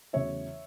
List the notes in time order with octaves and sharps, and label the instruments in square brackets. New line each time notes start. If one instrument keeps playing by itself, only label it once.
[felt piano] E2 C#3 F#3 A3 C#5 E5